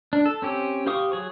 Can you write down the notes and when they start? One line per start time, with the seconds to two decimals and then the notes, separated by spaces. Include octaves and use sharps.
0.13 D4
0.26 A4
0.42 C4 C#4 G4
0.87 G4 C5 F5 C#6 D#6
1.12 F#3 G#4 C#6